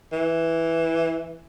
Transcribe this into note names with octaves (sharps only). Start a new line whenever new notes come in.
E3